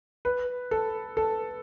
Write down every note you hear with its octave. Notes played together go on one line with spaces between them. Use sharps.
B4
A4
A4